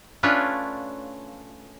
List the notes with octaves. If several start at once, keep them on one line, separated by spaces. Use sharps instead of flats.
A3 C#4 D4 F4 B4 C#5